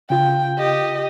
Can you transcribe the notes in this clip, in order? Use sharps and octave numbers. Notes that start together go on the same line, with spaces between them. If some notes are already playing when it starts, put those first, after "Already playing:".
C#3 F4 G5
G4 D#5